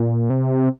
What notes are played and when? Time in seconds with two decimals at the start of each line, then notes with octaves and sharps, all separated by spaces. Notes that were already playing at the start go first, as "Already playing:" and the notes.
Already playing: A#2
0.30 C3